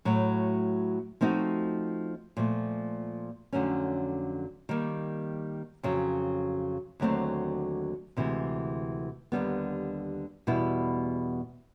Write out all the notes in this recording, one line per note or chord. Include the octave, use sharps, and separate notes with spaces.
A2 F#3 A3
F3 A3 C4 D#4 F#4
A#2 F3 A3
F2 D3 F#3 A3 C#4
D#3 G3 A#3
F2 C#3 F#3
D#2 D3 F#3 A3 C4
D2 C3 E3 G#3
D#2 D3 G3 B3
E2 B2 G3 B3 E4